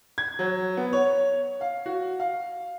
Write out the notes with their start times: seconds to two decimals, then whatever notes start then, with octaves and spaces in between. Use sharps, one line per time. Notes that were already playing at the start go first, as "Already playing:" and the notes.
0.18 G#6
0.39 F#3
0.77 B3
0.93 C#5
1.61 F5
1.86 F#4
2.20 F5